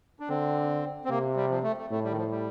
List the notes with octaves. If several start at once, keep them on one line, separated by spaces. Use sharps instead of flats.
D4
D3 C4
C4
C3 A#3
G3
F3
A3
A3
A2 A3
G3
D#3
F3
G3